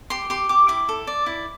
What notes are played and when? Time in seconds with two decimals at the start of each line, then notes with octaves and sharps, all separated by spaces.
0.10 G4 C6
0.30 G4 C6
0.49 G4 D6
0.68 E4 D6
0.89 A4
1.07 D5
1.26 E4